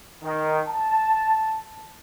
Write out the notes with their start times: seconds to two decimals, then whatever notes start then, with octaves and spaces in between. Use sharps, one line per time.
0.23 D#3
0.66 A5